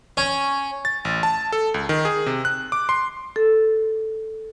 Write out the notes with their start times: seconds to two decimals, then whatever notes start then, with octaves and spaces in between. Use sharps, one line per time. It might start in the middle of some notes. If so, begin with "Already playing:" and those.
0.17 C#4
0.85 A6
1.05 A1
1.23 A5
1.52 A4
1.74 C#2
1.89 D#3
2.05 G#4
2.26 C3
2.45 F#6
2.72 D6
2.89 C6
3.36 A4